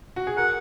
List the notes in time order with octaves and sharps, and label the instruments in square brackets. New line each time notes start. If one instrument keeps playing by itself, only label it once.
[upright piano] F#4
G#4
[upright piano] A#4 [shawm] F#5